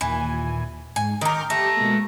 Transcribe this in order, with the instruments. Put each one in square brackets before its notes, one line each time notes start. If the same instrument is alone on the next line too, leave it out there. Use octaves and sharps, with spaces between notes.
[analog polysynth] D#2 A#2 G#5 [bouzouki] E3
[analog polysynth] G#2 [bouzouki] G#5
[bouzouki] D#3 A#4 [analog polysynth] D6 F6 G6
[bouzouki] A3 [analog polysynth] G4 [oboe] A#5
[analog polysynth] B2 G#3 A#3